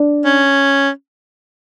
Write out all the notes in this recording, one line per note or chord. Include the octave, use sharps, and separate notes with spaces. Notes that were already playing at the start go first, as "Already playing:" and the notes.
Already playing: D4
C#4